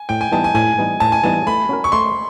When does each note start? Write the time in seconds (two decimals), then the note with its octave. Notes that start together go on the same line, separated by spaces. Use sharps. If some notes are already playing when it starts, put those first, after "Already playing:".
Already playing: G#5
0.09 A2 G5
0.21 G#5
0.32 E3 G3 B3 D#4 A5
0.44 G#5
0.55 A2 G#5
0.78 E3 G3 B3 D#4
1.00 A2 A5
1.12 G#5
1.24 E3 G3 B3 D#4 A5
1.47 A3 B5
1.69 C#4 F#4 A#4
1.84 C#6
1.92 A3 C6